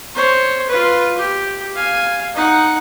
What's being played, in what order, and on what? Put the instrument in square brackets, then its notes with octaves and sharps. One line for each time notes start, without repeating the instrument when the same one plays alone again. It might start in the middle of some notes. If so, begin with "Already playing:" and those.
[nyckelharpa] C5 C#5
F4 B4
G4
F5 G#5
D#4 F#5